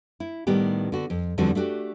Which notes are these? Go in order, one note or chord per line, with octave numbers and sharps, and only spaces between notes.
E4
A2 D#3 G3 B3 G4
D3 F#4
F2
E2 D3 F3 G3 C4 F#4
A3 D4 F#4 G4